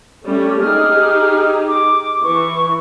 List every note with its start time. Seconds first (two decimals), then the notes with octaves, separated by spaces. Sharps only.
0.24 G3 A3 C#4
0.61 D#4 G4 G#4 F6
1.68 D6
2.23 E3 C#6